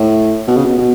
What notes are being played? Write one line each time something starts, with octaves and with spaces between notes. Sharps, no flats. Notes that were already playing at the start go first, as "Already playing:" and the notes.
Already playing: A2
B2
C#3
B2
B2